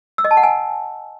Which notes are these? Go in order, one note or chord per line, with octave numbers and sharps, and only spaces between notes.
E6
D#5
A5
F#5
G#5